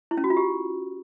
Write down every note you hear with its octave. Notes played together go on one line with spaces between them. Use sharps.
E4
C#4
F#4
F4
G4